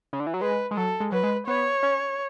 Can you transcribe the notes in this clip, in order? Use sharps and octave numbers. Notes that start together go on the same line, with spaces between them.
C#3
D3
E3
F#3
G#3 B4
G#3
F#3 A4
G#3
F#3 B4
G#3
B3 C#5
C#4